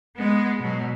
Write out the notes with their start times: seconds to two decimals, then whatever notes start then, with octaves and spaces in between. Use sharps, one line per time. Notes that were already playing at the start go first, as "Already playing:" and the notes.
0.17 G#3 B3
0.60 B2 F#3